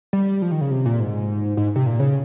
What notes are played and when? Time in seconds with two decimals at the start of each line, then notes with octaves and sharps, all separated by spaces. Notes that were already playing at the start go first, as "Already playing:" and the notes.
0.13 G3
0.42 F3
0.51 D#3
0.61 C#3
0.71 C3
0.86 A#2
1.00 G#2
1.57 G#2
1.76 C3
1.86 A#2
2.00 C#3